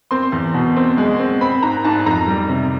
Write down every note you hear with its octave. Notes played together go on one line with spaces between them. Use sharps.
C4 C6
E2
B2
C4
G#3
C4
C4 B5
G#2 A#5
G#2 A5
F2 A#5
G3
C3